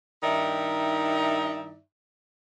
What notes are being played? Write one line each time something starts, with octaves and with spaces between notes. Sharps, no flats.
G2 D#3 D#4 E4 D5 E5